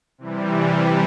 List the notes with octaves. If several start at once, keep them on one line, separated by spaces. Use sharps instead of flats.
C3 E3 G3